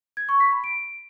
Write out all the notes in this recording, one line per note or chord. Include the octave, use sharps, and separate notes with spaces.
G#6
C#6
B6
B5
D7